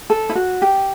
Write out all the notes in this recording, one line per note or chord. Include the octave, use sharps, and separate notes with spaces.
A4
E4
F#4
G4